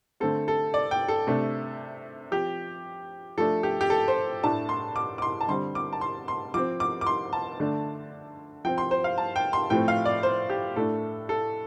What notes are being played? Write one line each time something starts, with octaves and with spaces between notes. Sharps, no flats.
D3 A3 C4 A4
A4
D5
G5
A4
C3 A3 D4
F3 C4 G4
F3 A3 D4 A4
G4
G4
A4
C5
A2 A3 D4 A5
C6
D6
D6
C6
A5
D3 G3 C4 C6
D6
A5
C6
C6
F3 C4 D6
D6
D6
C6
A5
D3 A3 D4
F3 C4 G5
C6
C5
F5
A5
G5
C6
A2 F3 A3 C4 G5
F5
D5
C5
G4
A2 A3 D4 A4
A4